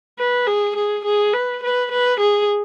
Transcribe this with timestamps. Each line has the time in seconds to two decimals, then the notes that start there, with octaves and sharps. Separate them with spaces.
0.19 B4
0.47 G#4
0.76 G#4
1.05 G#4
1.33 B4
1.63 B4
1.91 B4
2.20 G#4